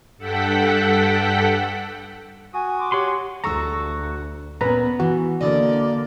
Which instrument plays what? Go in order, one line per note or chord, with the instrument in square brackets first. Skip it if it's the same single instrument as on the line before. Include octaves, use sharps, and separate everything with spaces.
[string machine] G2 A4 F#5 G5 B6
[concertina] F#4 D#6 [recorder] G#5
[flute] C6 [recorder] D6
[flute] G4 [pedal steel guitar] C#5 F#5 C6
[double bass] D2 [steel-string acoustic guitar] F#4 A4 [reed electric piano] A#5 C#6 E6
[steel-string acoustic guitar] A#2 C#4 F#4 [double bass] B3 [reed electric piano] B4 A#5
[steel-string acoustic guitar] E3 [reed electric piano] F#4
[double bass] D3 A#3 [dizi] D5 [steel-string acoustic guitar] D#5